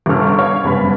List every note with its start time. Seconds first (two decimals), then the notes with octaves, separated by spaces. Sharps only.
0.06 G1 C#3 A4 F6
0.39 C#5 F5
0.63 F#1 G2 C#3 B3 B5